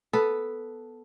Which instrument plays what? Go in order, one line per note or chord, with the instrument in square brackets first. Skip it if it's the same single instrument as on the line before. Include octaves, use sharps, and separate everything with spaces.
[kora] B3 A4 B4